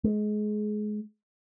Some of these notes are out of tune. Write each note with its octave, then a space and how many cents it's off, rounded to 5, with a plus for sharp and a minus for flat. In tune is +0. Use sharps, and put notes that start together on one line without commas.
G#3 +25